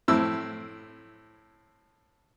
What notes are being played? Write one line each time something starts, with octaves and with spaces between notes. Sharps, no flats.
A2 C4 E4 E6